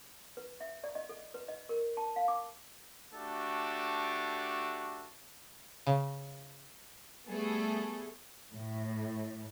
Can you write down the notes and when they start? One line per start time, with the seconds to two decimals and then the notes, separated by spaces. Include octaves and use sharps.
0.37 B4
0.60 E5
0.84 D5
0.95 D#5
1.09 A4
1.34 B4
1.48 D#5
1.69 A#4
1.97 A5
2.16 F5
2.28 D6
3.13 A3 D4 F#4 G4 A4
5.87 C#3
7.29 G3 A3 B3 G#4 A4
8.52 A2